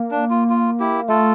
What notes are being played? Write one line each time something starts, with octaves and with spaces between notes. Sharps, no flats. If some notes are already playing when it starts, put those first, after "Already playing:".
Already playing: A#3
D4
F4
F4
E4 G4
A3 F4 A4